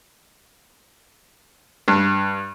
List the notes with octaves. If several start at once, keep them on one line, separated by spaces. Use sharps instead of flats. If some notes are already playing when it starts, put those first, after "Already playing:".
G2